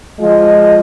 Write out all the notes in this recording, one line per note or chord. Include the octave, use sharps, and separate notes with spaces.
F3 G#3 F4 D#5